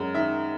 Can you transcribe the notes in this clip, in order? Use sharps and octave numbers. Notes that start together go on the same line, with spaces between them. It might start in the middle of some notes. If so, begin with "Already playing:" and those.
Already playing: F#2 G#3
D#3 E5